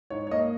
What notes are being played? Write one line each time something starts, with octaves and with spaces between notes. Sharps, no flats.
G#2 C#5
C#5
A#3 D#5